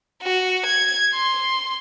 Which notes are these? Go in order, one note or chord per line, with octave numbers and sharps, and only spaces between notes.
F#4
G#6
C6